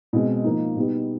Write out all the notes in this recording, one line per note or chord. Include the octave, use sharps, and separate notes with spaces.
B2 G#3 C4
F3 A#3 D#4
B2 G3 B3 D#4